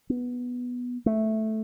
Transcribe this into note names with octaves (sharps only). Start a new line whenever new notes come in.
B3
A3